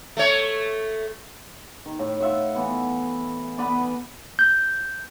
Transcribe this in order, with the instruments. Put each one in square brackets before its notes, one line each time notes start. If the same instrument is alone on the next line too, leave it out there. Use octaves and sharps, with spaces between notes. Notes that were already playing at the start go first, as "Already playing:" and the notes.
[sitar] A3 C#5
[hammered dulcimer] D#3
A2
F4 E5 F#5
E3 B3
B3 B4 D5 B5
[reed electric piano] G6